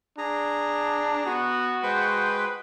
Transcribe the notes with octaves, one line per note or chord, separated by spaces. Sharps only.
D4 G#4 A#5
B3 F#4
G#3 B4 C5 G5